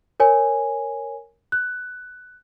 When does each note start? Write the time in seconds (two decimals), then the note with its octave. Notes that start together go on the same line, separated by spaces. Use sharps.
0.20 A#4 C#5 G#5
1.52 F#6